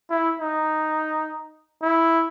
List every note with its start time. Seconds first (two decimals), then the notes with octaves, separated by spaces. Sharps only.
0.10 E4
0.40 D#4
1.82 E4